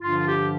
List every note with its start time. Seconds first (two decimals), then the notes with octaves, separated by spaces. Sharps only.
0.01 G2 D3 F3 F4
0.26 G4